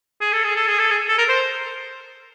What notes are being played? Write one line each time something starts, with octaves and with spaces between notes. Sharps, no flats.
G#4
A4
G#4
A4
G#4
A4
G#4
A4
A#4
C5